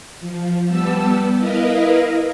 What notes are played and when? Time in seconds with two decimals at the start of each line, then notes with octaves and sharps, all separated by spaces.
0.20 F3
0.67 G3 B3 A5 E6
1.37 E4 A#4 B4 D#5 F5